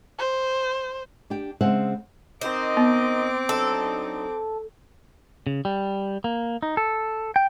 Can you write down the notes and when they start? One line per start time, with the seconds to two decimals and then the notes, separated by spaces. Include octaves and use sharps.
0.19 C5
1.30 D4 G4 G5
1.61 C#3 G#3 C4 C5 E5 F#5
2.41 C4 D#4 A#4 C5 D#5 D6
2.77 B3
3.49 F#3 D4 D#4 A4
5.47 C#3
5.65 G3
6.24 A#3
6.63 D#4
6.77 A4
7.36 G5